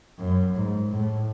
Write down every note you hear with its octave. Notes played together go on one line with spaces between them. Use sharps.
F#2
G#2
A2